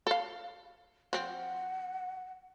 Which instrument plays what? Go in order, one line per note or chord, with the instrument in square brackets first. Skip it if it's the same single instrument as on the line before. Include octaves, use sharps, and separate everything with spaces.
[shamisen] A4 F5
[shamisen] F3 C4 [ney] F#5